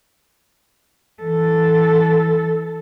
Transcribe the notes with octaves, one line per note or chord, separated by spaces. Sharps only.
E3 A4